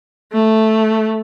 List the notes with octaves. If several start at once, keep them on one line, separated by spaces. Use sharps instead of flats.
A3